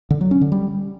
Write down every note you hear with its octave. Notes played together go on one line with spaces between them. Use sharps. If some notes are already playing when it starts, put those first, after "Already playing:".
D3
F#3
C#4
D3
G3